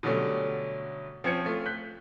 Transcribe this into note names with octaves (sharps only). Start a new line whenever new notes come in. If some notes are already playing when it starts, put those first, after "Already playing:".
B2 D3 F#3 G3 A3 C#4
F3 C4 C#4 G#6 C#7
A3 F4
F#6 G6 B6